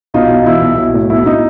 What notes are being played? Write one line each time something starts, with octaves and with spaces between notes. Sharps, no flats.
B1 D#4 F4
B1
E3 E4
B1
B1
A2
B1 E4
D#4